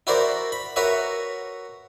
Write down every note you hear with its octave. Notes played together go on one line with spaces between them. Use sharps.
E4 F#4 A#4 C5 D5
B5
F#4 A#4 B4 C#5 E5